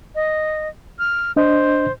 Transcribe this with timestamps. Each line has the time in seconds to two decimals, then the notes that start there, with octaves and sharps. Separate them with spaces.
0.15 D#5
0.99 F6
1.36 D4 C5 D#5